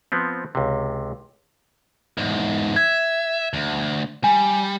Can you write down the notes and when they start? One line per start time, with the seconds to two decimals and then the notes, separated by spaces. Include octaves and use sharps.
0.12 F3 B3 C4
0.55 C#2 C3
2.17 E2 G#2
2.76 E5 G#6
3.53 D2
4.24 G3 G#5